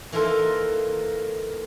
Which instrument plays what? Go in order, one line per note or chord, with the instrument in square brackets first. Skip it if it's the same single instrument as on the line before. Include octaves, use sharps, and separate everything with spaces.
[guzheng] E3 A#3 D#4 F4 A4